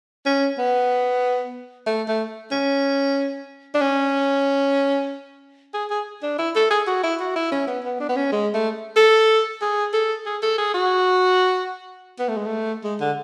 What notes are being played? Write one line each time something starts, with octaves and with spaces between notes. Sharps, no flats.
C#4
B3
A3
A3
C#4
D4
C#4
G#4
G#4
D4
E4
A4
G#4
F#4
E4
F#4
E4
C#4
B3
B3
D4
B3
C#4
G#3
A3
A4
G#4
A4
G#4
A4
G#4
F#4
B3
A3
G#3
A3
G#3
D3